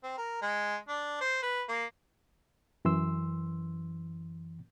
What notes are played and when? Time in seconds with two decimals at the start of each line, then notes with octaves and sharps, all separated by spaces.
0.03 C4
0.18 A#4
0.42 G#3
0.88 D4
1.21 C5
1.43 B4
1.69 A#3
2.85 F#2 E3 C6 E6